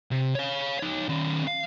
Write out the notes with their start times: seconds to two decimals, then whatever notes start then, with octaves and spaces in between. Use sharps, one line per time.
0.11 C3
0.35 C#5 F5
0.79 D#4 C#5
1.09 D#3 C#4
1.47 F5